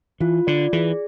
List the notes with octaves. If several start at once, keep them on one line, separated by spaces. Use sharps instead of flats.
E3 F4
D3 D5
E3 G#4